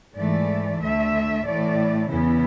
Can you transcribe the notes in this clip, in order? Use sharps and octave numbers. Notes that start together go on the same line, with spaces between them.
G#2 E3 A3 D5
D2 D3 A3 E5
A2 E3 A3 D5
E2 C#3 E3 B3 E4